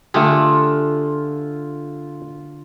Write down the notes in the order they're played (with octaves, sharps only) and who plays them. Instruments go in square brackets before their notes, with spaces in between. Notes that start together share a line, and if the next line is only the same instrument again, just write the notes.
[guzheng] D3 [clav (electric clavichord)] A3 G4 G#4 [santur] F4